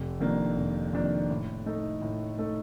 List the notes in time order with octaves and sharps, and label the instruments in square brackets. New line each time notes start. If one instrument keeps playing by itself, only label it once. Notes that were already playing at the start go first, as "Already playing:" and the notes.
Already playing: [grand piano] F1
F2 D#3 A#3 D4
F1
F2 D#3 A#3 D4
A2
A3 D#4 A4
A2
A3 D#4 A4